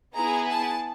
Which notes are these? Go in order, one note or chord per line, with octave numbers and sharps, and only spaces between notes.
B3 E4 G#4 A#5
A5